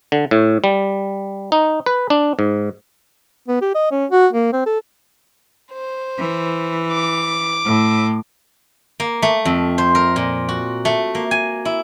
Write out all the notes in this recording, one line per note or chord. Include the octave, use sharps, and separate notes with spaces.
D3
A2
G3
D#4
B4
D4
G#2
B3
G4
D#5
C#4
F#4
A#3
C4
A4
C5
E3
D6
A2
A#3
A3
F2
C5
A#4
A#2
F#4
A3
A#3
G#5
E4